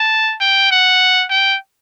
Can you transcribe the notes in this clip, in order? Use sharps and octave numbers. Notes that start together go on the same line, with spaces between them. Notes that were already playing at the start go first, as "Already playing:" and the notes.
Already playing: A5
G5
F#5
G5